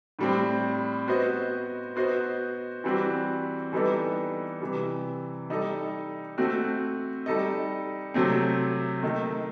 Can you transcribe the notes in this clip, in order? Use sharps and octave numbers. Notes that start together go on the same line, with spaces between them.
A2 G3 C4
B3 F#4 C5 D#5
B3 F#4 C5 D#5
E3 G3 C4 F#4 B4
E3 G3 B3 D#4 A4
C3 E3 G3
G3 D#4 A4 D#5
A3 C4 F#4
G3 D#4 A4 D#5
C3 F#3 A3 C4
D#3 A3 D#4